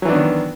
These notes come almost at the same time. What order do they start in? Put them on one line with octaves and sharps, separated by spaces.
F#3 E3 D4 B3 D#3